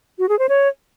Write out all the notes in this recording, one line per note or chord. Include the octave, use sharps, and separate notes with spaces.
F#4
G#4
C5
C#5